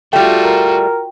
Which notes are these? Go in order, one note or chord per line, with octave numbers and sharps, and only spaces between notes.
G3 A3 F4 F#4 G5
A#4